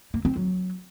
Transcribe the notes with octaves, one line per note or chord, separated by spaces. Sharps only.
A#3
C4
F#3